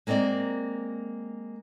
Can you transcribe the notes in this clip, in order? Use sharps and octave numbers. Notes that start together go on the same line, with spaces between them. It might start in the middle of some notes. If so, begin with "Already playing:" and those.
G#3 A#3 C4 A#4 D5